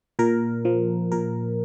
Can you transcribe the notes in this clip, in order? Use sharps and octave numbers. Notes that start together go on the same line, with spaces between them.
A#2 A#4
F3
A#2 A#4